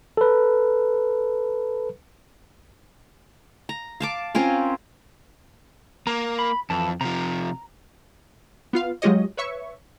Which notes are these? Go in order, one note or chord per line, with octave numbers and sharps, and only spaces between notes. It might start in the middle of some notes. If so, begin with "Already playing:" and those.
A4 B4
A#5
F5 A5 D6
C4 C#4 F4 A#4
A#3 A#5
B5
F2 E3 A5
C3 F3 A#5
B3 F4 F5
F#3 G#3 F4 G4 C#5 D#5
B4 C#5 E5 C#6